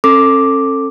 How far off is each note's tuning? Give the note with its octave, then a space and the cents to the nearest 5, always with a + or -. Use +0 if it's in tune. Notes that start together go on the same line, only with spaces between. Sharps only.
C#4 -45 A4 +20 D6 +0